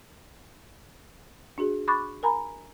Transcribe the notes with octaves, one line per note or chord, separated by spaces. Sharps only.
D4 F#4 G#4
B5 C#6 D6 F#6 A6
A#4 G#5 A#5 B5